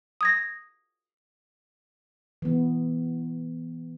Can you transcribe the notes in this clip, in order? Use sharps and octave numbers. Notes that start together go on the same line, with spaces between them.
D#6 G#6 A#6
E3 B3